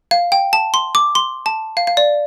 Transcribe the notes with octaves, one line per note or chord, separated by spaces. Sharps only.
F5
G5
A5
C6
D6
C6
A5
F5
F5
D5